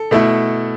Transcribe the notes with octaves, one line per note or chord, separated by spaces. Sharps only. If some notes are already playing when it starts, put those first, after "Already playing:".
Already playing: A4
B2 A3 E4